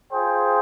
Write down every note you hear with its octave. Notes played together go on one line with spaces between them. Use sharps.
F4 G#4 C5 G5